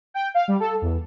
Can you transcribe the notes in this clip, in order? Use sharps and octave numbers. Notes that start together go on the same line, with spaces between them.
G5
F5
G3
A4
E2